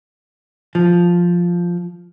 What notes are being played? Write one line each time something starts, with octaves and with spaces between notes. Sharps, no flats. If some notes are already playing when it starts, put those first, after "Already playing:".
F3